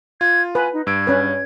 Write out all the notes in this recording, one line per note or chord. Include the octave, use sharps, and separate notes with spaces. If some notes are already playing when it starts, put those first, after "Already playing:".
F4 G#6
B4 G#5
D#4
G2 E6 G#6 D7
C#4 B4